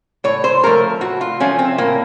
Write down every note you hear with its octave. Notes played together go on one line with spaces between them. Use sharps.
A2 C#5
C5
F3 A3 A#4
A2 F#4
F4
F3 A3 C#4
C4
A2 A#3